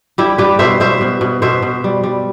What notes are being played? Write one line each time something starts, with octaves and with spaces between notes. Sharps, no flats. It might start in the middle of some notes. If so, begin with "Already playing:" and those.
G3 E4 G4
G3 G4 B4
B2 C5 E5
B2 C5 E5
B2
B2
B2 C5 E5
B2
G3
G3